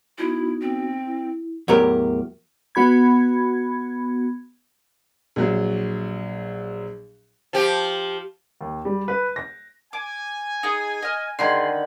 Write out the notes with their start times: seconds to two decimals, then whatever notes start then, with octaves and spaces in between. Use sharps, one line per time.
0.18 B3 D#4 E4 F#4
0.61 C4
1.06 E4
1.68 E2 A2 F#3 G4 A#4
2.75 B3 F#4 B5 G#6
5.36 A#1 F#3
7.53 F3 G4
8.61 D#2
8.85 G3
9.08 B4
9.36 A#6
9.93 G#5 D6
10.63 D#4 G#4
11.03 D#5 F6
11.39 D3 D#3 F4 G#4 B5 C6